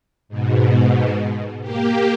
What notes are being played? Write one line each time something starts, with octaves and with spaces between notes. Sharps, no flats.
G#2 B2
A#3 G4